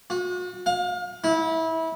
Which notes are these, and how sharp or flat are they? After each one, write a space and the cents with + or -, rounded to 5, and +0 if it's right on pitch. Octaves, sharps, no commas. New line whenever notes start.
F#4 -40
F5 +35
E4 -25